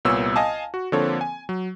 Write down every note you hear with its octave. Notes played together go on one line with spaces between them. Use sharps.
C2 A#2 B3 C#5 E6
D#5 F5 G#5 A5
F#4
D3 F3 A#3 C4 A4 C#5
G#5
F#3